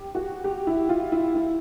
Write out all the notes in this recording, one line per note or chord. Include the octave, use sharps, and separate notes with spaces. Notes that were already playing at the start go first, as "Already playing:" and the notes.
Already playing: G4
F#4
G4
E4
F4
E4
E4